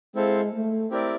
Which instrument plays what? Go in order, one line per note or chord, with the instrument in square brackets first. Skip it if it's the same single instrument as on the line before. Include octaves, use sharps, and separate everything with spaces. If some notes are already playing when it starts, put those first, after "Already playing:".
[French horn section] G#3 [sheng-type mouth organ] C4 E4 A4 C5 F5
[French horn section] A3
[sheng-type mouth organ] C4 E4 G4 A#4 D5